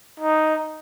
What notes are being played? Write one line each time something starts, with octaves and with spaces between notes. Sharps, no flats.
D#4